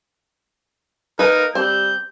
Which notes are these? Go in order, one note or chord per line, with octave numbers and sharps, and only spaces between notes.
A#3 D#4 A#4 B4
G3 C4 G6